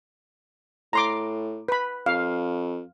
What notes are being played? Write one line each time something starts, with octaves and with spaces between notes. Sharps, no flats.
A2 A#5 C6 D6
B4 B5
F2 F5